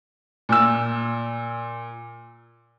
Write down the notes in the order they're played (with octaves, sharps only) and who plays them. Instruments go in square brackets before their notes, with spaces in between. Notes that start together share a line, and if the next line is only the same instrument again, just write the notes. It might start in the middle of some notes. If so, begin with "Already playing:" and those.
[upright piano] A#2 E6